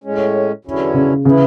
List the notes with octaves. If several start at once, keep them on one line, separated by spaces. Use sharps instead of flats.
A2 G#3 C#4
E2 D3 F#3 C#4 E4
C#3
C#3 E3 B3 E4